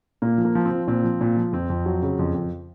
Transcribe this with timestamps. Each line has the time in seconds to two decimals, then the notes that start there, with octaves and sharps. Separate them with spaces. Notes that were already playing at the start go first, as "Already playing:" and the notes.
0.22 A#2 A#3
0.38 F3
0.45 A#3
0.55 F3
0.65 C4
0.71 F3
0.88 A#2 C4
1.04 F3
1.21 A#2
1.37 F3
1.53 F2 C4
1.70 F2
1.86 F#3
2.02 C#3
2.19 F2
2.34 F2